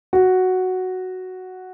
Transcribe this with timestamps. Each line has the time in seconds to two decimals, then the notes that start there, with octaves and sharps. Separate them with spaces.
0.13 F#4